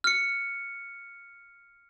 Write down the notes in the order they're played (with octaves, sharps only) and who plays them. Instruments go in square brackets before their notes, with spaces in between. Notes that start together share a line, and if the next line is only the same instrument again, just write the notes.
[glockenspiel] F6 C#7